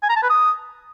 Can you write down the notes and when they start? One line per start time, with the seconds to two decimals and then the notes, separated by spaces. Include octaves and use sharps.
0.03 G#5
0.09 A#5
0.16 A5
0.23 B4
0.30 D#6